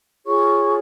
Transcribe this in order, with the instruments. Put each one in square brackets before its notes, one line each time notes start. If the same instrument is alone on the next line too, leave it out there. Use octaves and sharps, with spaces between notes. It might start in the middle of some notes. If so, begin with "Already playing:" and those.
[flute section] F4 G#4 C#5 C#6